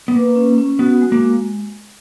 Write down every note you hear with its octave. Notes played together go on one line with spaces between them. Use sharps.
B3
A#3 B4
C#4
C#4
B3 F#4
G#3
A#3